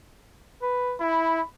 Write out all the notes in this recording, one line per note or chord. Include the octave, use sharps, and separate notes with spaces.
B4
E4 B5